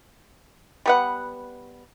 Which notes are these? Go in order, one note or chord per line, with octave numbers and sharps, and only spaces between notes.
G3 B3 F#5